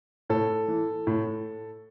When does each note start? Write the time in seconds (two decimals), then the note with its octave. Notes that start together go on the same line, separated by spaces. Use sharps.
0.30 A2 A4
0.68 E3
1.07 A2